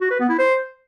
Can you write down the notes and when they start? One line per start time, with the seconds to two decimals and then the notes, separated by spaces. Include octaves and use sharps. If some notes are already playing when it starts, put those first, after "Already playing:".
0.01 F#4
0.11 B4
0.20 B3
0.29 E4
0.39 C5